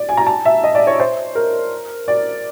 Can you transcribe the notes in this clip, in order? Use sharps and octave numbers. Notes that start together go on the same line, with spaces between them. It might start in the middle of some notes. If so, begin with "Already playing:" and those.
Already playing: D5
G#5
A#5
A5
E5
D#5
D5
C#5
C5
A#4
D5